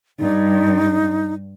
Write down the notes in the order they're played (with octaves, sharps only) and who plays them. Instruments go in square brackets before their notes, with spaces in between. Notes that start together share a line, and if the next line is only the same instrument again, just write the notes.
[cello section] G2 [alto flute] D#4